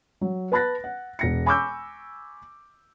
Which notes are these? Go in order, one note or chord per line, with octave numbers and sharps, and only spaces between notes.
F#3
B4 A5 B5 F#6 A6 A#6
F#5
E1 A#6 C#7
G#5 B5 C#6 D6 E6 G6